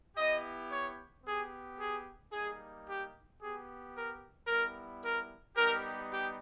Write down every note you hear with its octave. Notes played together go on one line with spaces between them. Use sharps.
B3 E4 G4 D#5
C#5
B3 G4 G#4
G#4
G3 A#3 D#4 G#4
G4
B3 G4 G#4
A#4
G3 B3 E4 A#4
A#4
G3 B3 D#4 G4 A#4
G4